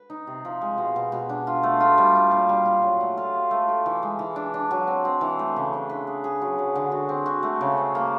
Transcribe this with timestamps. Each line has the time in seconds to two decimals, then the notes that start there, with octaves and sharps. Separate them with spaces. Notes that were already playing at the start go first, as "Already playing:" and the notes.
Already playing: B4
0.10 D#4
0.27 C3
0.45 F3
0.61 G#3
0.78 B2
0.96 B2
1.12 B2
1.29 D4
1.47 F4
1.63 A3
1.80 F4
1.98 G3
2.15 F4
2.31 A#2
2.49 G3
2.65 F4
2.83 F#3
3.00 A3
3.18 F4
3.34 G4
3.51 A3
3.68 G4
3.86 E3
4.03 G#3
4.19 E3
4.36 D4
4.54 D4
4.71 F#3
4.87 C4
5.05 C4
5.21 E3
5.39 A3
5.56 C#3
5.73 D4
5.89 B4
6.07 G#4
6.24 G#4
6.42 F#3
6.59 F#3
6.75 D3
6.92 F#4
7.09 C4
7.26 F#4
7.43 A3
7.61 C#3
7.78 C4
7.95 A#3